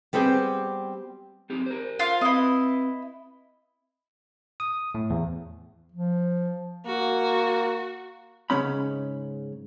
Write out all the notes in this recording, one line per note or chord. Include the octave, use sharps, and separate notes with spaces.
G3 B3 C4 G4 G#4
C4 D#4 G4
A#4 C5
F4 F5
C4 E4 B4 D#5
D#6
A2
E2
F3
A#3 F#4
G#2 C#3 C#4 B5